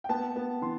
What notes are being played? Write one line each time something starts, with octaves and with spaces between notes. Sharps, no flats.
G5
B3 A5
B3
E3 C6